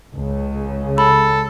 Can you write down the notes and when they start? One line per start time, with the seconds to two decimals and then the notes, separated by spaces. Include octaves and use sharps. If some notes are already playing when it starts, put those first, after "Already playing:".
0.16 C#2 C#3
0.98 A4 B5